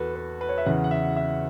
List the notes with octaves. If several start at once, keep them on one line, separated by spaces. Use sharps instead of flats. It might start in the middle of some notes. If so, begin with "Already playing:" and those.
Already playing: E2 F#4 A4 B4
B4
B4
C#5
E5
E2 C#3 E3 F#5
F#5
E5
E5